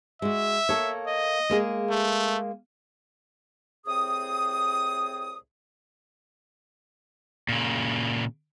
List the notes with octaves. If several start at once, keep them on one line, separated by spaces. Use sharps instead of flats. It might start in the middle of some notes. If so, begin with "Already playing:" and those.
G#3 F#4 E5
A#3 A4 C#5
D#5
G#3 A#3 G#4
A3
C2 A2 C4 G#4 D#6
A#2 C#3